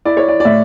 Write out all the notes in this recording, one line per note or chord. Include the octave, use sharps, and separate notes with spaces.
E4 D5
C#5
D5
D5
A2 E5